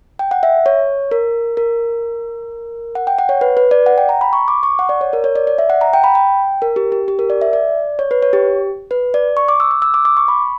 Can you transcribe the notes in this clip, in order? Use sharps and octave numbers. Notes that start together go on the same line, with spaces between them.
G5
F#5
E5
C#5
A#4
A#4
F#5
G5
F#5
C#5
B4
B4
D5
F#5
G5
A#5
B5
C#6
D6
C#6
F#5
D5
C#5
A#4
C#5
D5
D5
E5
F#5
A#5
G5
B5
G5
A#4
G4
G4
G4
A#4
D5
E5
D5
C#5
B4
C#5
G4
B4
D5
C#6
D6
E6
D6
E6
D6
D6
C#6
B5